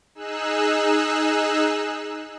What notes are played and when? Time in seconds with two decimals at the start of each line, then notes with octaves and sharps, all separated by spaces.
0.15 D#4 G#4 E6 F#6